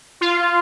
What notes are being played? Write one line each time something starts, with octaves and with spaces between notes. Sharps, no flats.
F4